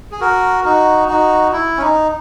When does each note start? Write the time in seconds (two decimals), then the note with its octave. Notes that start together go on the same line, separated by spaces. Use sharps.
0.11 G#4
0.20 F#4 A#4
0.65 D#4 F#4
1.08 D#4 F#4
1.52 E4
1.78 C#4
1.81 D#4